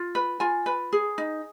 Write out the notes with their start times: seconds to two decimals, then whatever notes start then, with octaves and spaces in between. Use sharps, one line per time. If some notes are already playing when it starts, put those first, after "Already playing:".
Already playing: F4
0.15 B4
0.40 F4 G#5
0.66 B4
0.93 G#4
1.18 D#4